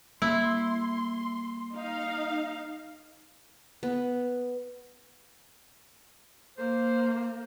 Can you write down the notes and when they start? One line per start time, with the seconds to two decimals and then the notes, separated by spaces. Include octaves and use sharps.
0.22 G3 A#3 E4 C6
1.74 D#4 F5
3.83 B3
6.58 A#3 C5